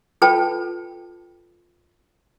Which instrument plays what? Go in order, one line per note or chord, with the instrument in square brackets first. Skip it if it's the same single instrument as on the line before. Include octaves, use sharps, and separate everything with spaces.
[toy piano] F4 A4 B4 G5 A5